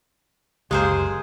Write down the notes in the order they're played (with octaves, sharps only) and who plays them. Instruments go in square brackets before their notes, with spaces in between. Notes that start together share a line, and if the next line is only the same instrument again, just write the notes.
[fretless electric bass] F#1 C#2 [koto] G#3 A#3 C5 [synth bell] G4 [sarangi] G#4